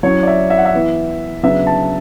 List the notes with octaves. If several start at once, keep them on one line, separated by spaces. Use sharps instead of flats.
F#3 C#4 E4 C#5
D5
E5
E5
F#5
E5
E3 B3 E4
C#3 F#3 B3 D4 E5
A5